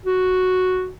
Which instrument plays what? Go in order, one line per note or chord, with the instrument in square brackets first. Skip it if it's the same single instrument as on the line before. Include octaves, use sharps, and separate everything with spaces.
[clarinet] F#4